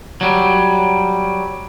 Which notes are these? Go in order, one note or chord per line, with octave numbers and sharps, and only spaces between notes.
F#3 G3